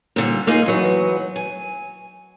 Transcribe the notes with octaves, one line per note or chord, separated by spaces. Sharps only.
A#2 D3 G3
A#3 D#4 F4 G#4
E3 F#3 B3
G#5